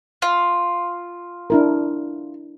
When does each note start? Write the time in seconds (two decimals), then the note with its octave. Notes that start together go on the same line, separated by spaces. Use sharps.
0.22 F4
1.50 D4 E4 A#4